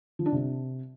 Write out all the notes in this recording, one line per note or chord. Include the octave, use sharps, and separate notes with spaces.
F3
D4
C3